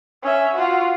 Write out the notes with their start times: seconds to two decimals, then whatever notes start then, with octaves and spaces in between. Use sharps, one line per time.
0.23 C#4 E5
0.54 F4 F#4